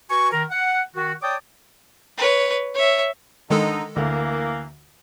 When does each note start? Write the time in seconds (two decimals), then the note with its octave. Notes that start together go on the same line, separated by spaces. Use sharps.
0.09 F#4 B4 G#5 C#6
0.32 D#3 A#4
0.50 F#5
0.94 D#3 F#4
1.22 C#5 D5 G5 A5 D6 D#6
2.18 B4 C#5
2.75 C#5 E5
3.50 D3 D#3 G#3 D#4 A4
3.96 D2 E3 A#3